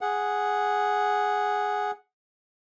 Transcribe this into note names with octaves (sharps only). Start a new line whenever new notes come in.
G#4 F#5